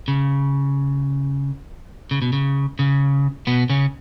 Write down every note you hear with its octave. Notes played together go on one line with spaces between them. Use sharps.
C#3
C#3
B2
C#3
C#3
B2 B3
C#3 C#4